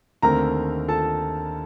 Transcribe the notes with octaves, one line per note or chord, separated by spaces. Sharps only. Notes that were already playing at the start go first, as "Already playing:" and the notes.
D#2 D3 A3 C4 A#4 A#5
A4 A5